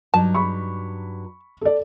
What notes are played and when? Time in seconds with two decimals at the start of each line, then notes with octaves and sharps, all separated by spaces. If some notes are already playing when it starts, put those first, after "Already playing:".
0.14 G2 F#3 D#4 A5
0.34 B5 C#6
1.61 A4 D5